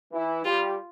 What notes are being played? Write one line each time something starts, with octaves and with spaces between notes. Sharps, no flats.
E3 E4
G3 F4 G4